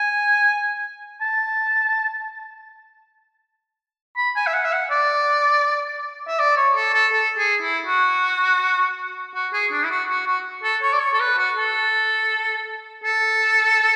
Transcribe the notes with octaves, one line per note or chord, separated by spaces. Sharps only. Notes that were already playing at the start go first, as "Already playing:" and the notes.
Already playing: G#5
A5
B5
G#5
E5
F#5
E5
F#5
D5
E5
D5
C#5
A4
A4
A4
G#4
E4
F#4
F#4
G#4
D4
E4
F#4
F#4
F#4
A4
C#5
D5
C#5
A4
B4
F#4
A4
A4